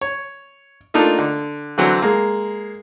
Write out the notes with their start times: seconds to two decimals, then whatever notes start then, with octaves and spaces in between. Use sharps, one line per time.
0.01 C#5
0.94 A3 A#3 D4 D#4 F4
1.19 D3
1.78 D3 E3 F#3 C4
2.02 G#3 A#3